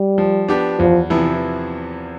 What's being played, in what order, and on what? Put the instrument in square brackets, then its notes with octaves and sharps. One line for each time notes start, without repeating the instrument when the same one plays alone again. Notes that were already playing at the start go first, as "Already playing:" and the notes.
Already playing: [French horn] G3
[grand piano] F3
B3 D4 G4
[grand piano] E2 [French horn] F3
[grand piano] C3 F3 B3 E4 [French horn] E3